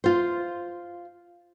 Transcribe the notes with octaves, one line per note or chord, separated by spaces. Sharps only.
F4 C5